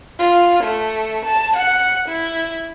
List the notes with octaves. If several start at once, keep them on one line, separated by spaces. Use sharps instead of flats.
F4
A3
A5
F#5
E4